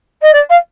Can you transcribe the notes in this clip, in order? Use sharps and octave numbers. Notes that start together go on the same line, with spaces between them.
D#5
D5
F5